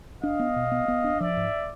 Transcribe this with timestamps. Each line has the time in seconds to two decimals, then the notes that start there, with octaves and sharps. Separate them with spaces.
0.23 D4 D#5 F5
0.39 B3
0.56 B2
0.72 B3
0.88 B3
1.04 D4
1.20 F3 D5 E5
1.37 G#2